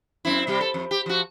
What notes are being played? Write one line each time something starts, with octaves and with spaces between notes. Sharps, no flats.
F#2 C4 E4
C3 G3 G4
A4
F2
G4
F3 F#4